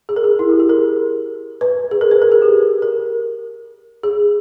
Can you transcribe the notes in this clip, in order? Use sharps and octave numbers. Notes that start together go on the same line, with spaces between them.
G#4
A#4
G#4
E4
G4
G#4
A#4
B4
G#4
A#4
B4
A#4
G#4
G4
A#4
G#4